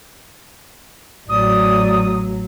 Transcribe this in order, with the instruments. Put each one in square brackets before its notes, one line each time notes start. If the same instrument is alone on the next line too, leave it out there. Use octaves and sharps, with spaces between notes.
[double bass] A1 F#3 [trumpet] D5 [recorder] D#6